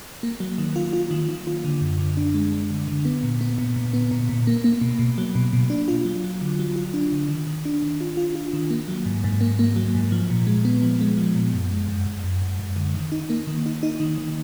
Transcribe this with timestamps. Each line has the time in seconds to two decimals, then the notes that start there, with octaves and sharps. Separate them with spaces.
0.23 A#3
0.40 F#3
0.58 D#3
0.76 F4
0.93 F4
1.11 D#3
1.29 D#3
1.47 F4
1.64 D3
1.81 F#2
1.99 D3
2.17 D4
2.34 G#3
2.52 G#3
2.70 D3
2.88 D3
3.05 B3
3.23 A#2
3.41 B3
3.58 A#2
3.76 A#2
3.93 B3
4.11 A#2
4.29 A#2
4.47 A#3
4.64 A#3
4.81 B2
4.99 B2
5.18 F#3
5.35 B2
5.53 B2
5.70 D4
5.88 F4
6.05 F#3
6.24 F#3
6.41 D3
6.59 F#3
6.76 F4
6.93 D4
7.12 D3
7.29 D#3
7.47 D#3
7.65 D4
7.83 D#3
8.01 F4
8.17 F4
8.35 F4
8.53 D#3
8.70 A#3
8.88 F#3
9.06 G#2
9.24 G#2
9.41 A#3
9.59 A#3
9.76 F#3
9.95 G#2
10.12 F3
10.30 A#2
10.47 G#3
10.65 B3
10.82 F3
11.01 G#3
11.18 F3
11.35 A#2
11.54 F#2
11.71 G#3
11.88 F#2
12.07 F#2
12.24 F#2
12.42 F#2
12.60 F#2
12.76 D3
12.95 D#3
13.12 D#4
13.30 A#3
13.47 D#3
13.66 D#4
13.83 D#4
14.00 D#3
14.18 D#3